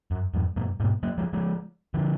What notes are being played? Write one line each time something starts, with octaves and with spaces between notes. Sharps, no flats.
F#2
F2 G#2
F#2 A#2
G#2 B2
F#3 A#3
F3 G#3
F3 G#3
D3 F3